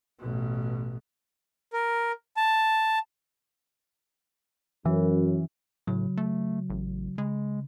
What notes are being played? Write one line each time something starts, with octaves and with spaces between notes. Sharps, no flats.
A1 B2
A#4
A5
F#2 E3
A2 C#3 F#3
A3
A1
C#3 G#3